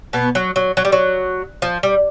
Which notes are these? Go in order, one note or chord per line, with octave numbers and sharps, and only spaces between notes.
B2 B3
F#3
F#3
F#3
G3
F#3
F3
G3